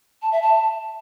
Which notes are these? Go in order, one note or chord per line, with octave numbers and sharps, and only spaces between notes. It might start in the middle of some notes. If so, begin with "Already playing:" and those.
A5
E5
A5